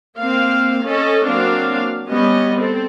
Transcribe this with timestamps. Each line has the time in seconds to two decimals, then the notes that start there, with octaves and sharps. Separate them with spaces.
0.18 A#3 C4 F5
0.83 C#4 A4 D#5
1.26 F#3 A#3 C4 D4 F5
2.07 G3 B3 C#4 D#5
2.55 C4 A4